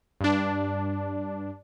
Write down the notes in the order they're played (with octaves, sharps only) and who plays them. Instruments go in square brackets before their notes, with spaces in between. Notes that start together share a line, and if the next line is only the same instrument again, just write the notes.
[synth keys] G2 D4